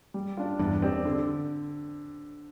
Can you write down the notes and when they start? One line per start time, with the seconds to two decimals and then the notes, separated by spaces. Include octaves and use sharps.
0.14 G3
0.37 D4 F4
0.59 E2 G2 G3
0.82 C4 G4 D5
1.05 D3